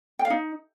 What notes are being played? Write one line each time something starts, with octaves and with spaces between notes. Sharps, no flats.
G5
F5
D#4